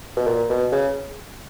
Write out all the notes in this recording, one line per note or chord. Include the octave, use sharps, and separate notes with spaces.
B2
A#2
B2
C#3